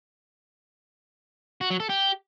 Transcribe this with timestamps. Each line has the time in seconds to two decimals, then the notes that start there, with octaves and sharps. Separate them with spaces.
1.61 F#4
1.70 F#3
1.80 A4
1.89 G4